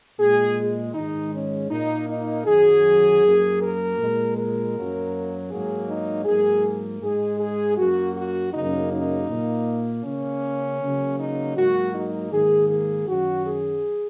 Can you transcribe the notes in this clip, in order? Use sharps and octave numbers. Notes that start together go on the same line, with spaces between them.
A#2 G#3 G#4
G#2 D#3 G#3 D#4
C#4
A#2 A#3 D#4
D#4
F#2 D#3 F#3 G#4
F#2 F#3 A#3
A#4
A#2 G#3
A#4
F#2 F#3 A#3
G#2 F#3 A#3 G#4
D#4
G#2 F#3 A#3 G#4
G#2 G#3 G#4
G#4
F#2 F#3 A#3 F#4
F#4
F#2 C#3 A#3 D#4
D#4
A#2 A#3
C#3 A#3 C#4
C#3 F#3 A#3
D#4
G#2 F#3 A#3 F#4
D#4
G#2 D#3 A#3 G#4
G#4
F#2 D#3 F#3 F#4
G#4